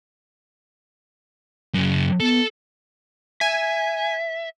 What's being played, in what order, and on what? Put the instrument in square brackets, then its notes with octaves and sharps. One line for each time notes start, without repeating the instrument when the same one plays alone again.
[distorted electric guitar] F#2 C#3
[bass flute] B3 [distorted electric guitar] A4
[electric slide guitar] E5 [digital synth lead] G#5